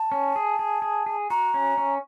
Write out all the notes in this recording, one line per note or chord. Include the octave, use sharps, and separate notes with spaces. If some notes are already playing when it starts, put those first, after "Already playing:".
Already playing: A5
C#4
G#4
G#4
G#4
G#4
F#4 A#5
C#4
C#4